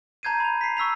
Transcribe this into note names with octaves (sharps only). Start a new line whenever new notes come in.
A5 A#5 G6 G#6 C7 D#7
B5 F7
B6 C7
C#6 E6 B6 F7